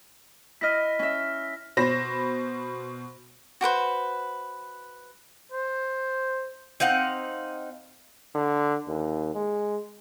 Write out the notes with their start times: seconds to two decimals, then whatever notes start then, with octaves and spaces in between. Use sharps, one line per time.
0.61 E4 D#5 F6 A#6 B6
0.99 C#4 E5
1.77 B2 C5 B5 A#6 E7
3.61 F#4 G4 B4 C5
5.52 C5
6.80 C4 D#4 F5 F#5
8.35 D3
8.87 D#2
9.34 G#3